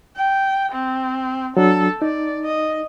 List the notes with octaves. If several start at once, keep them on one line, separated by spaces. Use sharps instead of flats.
G5
C4
F#3 D4 A4
D#4 D5
D#5